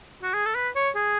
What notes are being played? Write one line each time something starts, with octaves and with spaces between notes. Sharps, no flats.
F#4
G#4
A4
B4
C#5
G#4